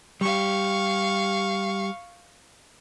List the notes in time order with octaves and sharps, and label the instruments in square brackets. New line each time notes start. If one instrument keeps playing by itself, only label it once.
[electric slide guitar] G3 G4 [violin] F5 C#6